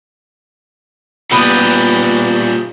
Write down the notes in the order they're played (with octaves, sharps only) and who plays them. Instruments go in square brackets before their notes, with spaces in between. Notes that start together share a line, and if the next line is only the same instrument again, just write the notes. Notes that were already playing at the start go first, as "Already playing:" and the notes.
[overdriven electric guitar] A#2 G3 [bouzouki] B3 B4